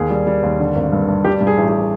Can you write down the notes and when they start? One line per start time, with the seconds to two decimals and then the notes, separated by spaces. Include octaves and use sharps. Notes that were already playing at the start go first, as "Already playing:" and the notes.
Already playing: D#2 G#4
0.10 G3
0.27 G3
0.43 D#2
0.60 D3
0.75 G#1
0.92 G2
1.08 G2
1.25 G3 G4
1.41 G2
1.47 G#4
1.57 A1
1.68 G#4